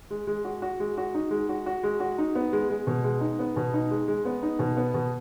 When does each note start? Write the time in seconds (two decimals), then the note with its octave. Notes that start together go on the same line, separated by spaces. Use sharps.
0.11 G#3
0.27 G#3
0.44 F#4
0.62 F#4
0.80 G#3
0.97 F#4
1.14 D#4
1.31 G#3
1.49 F#4
1.66 F#4
1.83 G#3
2.00 F#4
2.18 D#4
2.35 B3
2.53 G#3
2.70 G#3
2.87 B2
3.04 G#3
3.21 D#4
3.39 B3
3.56 B2
3.74 D#4
3.91 G#3
4.08 G#3
4.25 B3
4.43 D#4
4.59 B2
4.77 B3
4.94 B2